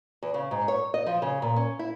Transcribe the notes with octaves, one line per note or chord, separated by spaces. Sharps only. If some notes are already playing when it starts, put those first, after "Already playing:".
E2
C#3
G#2
C#5
D#5
F3
C#3
A#2
C#4
E4